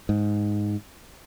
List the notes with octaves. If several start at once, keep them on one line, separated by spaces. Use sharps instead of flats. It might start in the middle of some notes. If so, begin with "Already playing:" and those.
G#2